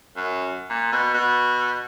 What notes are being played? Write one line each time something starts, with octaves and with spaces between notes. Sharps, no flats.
F#2
A#2
B2
B2